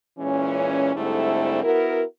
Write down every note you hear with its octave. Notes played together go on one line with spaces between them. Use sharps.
A#2 E3 G#3 C#4
G#2 D3 G3 A3 C4 E4
B3 E4 F#4 A#4